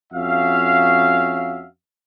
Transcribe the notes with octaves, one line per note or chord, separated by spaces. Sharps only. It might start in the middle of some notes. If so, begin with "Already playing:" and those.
F2 C#4 F#4 E5 F5